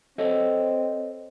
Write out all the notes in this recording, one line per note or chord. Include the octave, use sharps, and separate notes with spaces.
C4 A4 C#5 D#5